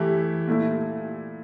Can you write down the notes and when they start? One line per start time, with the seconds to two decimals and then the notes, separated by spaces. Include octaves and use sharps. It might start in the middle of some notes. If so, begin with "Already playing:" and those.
Already playing: E3 A3 E4 G4
0.48 A#2 A3 E4